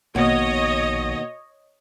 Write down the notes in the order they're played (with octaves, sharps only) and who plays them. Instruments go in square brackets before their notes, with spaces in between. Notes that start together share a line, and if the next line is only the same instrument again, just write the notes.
[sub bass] A#1 [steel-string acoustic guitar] D#2 B2 [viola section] C#5 D#5